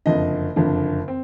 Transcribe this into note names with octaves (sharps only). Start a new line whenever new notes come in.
F#1 F2 D3 D#5
F#1 F2 D3
C4